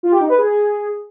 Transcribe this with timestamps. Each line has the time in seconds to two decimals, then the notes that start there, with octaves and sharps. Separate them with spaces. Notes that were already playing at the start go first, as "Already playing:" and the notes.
0.03 F4
0.12 G4
0.21 D#4
0.29 B4
0.38 G#4